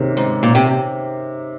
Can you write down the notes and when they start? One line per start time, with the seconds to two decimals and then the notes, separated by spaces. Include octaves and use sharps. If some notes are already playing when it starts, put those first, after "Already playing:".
Already playing: C3 D#3 A#3 C#4 G#4
0.17 G#2
0.43 A#2
0.55 C3